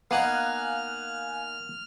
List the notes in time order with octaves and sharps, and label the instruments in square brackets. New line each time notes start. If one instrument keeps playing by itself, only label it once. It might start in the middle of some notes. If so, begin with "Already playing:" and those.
[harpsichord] A#3 D#4 [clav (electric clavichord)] B3 [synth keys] F5 G#5 F#6 [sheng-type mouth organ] F6